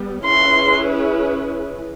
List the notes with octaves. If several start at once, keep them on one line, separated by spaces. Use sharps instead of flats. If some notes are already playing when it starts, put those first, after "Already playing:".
Already playing: G3 B3
C#4 E4 G#4 B4 C6